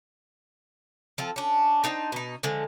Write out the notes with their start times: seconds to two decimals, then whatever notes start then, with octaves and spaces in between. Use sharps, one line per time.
1.18 F3 C4 A4
1.36 C#4 D4
1.84 D4 D#4 C5 G5
2.12 B2 D#4
2.43 D3 F3 G#3